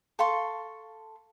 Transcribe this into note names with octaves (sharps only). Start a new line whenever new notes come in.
A4 F5 C6 C#6